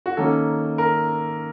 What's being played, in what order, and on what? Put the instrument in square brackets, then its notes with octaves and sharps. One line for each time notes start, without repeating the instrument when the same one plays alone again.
[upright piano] F#4
D#3 A#3 C#4 A4
A#4